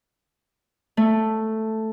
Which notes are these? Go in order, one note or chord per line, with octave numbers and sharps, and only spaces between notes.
A3